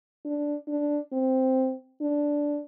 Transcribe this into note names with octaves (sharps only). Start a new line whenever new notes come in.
D4
D4
C4
D4